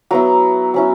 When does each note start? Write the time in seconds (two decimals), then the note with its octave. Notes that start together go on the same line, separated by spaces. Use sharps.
0.11 F#3 B3 E4 A#5
0.74 F#3 C#4 E4